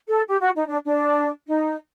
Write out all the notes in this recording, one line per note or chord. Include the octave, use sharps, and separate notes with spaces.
A4
G4
F#4
D#4
D4
D4
D#4